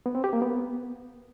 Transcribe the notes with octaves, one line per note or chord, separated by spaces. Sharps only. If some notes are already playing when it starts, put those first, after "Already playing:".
B3
C4
G4
A#3
B3